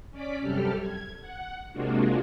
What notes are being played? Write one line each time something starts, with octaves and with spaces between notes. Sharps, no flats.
C#4 D5 D6 B6
F#2 C3 G3 G4 A4 F6
G#6
F#5
C3 G#3 A#3 D4 F4 F#4